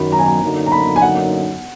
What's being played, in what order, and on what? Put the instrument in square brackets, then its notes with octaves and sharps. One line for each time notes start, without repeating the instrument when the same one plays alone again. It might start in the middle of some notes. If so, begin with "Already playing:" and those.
Already playing: [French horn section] F#2 D#3 F#3 [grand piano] B5
[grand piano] A#5
G#5
A#5
[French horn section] F#2 D3 F#3 A#3 D#4
[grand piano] A#5
B5
G#5
F#5